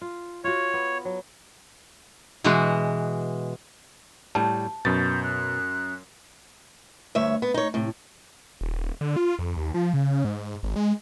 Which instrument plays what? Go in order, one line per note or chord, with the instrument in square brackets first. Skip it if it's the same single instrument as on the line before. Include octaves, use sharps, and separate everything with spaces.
[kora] F4
[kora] F4 F#4 [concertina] C#5
[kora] B3
F#3
[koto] B2 E3 G#3 B3 F#4
[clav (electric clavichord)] A2 G3 [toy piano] A5
[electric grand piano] F#2 A6 [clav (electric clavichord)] B2 [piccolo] G6
[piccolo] F#6
[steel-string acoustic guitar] D2 G2 C#5 E5
B3
D#4 C#5
A2 C3
[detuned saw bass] D#1
D3
F4
F2
D#2
F3
C#3
G#2
G#1
G#3